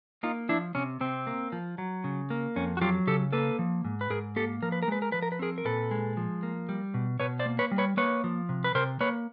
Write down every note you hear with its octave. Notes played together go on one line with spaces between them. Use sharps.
A#3 D#4 F4
F3 D4 E4
C3 C#4
C3 C4
A#3
F3
F#3
C#3
A#3
F2 C#4
F#4
F#3 F4 G4
C#3 G4 A4
A#3 A4 B4
F3
G#2
B4
G#2 G#4 A#4
A#3 G4 A4
F3 A#4
B4
A#4
G#3 B4
A#4
F3 B4
A#4
B4
C4 G#4 A#4
A#4
A#2 A4 B4
G#3
F3
A#3
G3
B2
B2 B4 C#5
C5 D5
A#3
B4 C#5
G3
B4 C#5
A#3 B4 C#5
F3
C3
B4
C3 A#4 C5
A#3 B4 C#5